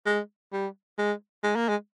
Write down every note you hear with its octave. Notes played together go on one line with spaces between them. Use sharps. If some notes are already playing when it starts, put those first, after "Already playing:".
G#3
G3
G#3
G#3
A#3
G#3